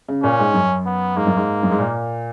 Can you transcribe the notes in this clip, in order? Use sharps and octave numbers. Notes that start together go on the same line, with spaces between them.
C#3
A#2 C#4
G#2
F#2
B3
G#2 A#3
F#2
G#2
F#2
G#2
A#2